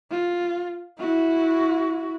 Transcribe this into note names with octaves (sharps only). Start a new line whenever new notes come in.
F4
E4 F#4